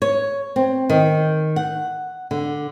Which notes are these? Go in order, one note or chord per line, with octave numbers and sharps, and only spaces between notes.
C#5
C4
D#3
F#5
D3